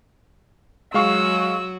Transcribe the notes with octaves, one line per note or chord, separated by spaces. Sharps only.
F#3 G#3 F#4 F5 C#6 E6